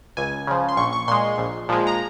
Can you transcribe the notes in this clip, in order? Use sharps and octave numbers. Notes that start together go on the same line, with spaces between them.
C#2 G#5
C#3 F3
C6
A#1 C#6
C#6
A#2 G#3 C6
A#1
A#2 F3 G#3
A#5